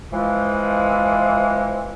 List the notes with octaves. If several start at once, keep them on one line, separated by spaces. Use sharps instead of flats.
E3 F3 G#3